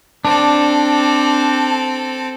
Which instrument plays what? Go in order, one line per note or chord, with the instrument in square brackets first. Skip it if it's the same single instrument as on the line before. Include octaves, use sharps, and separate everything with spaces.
[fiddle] C4 A4 [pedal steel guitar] D4